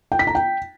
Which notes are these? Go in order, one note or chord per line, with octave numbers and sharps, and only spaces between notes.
G5
B6
A#5
G5